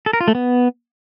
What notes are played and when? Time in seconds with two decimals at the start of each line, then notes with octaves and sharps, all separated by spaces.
0.06 A4
0.13 A#4
0.21 F4
0.28 A3
0.35 B3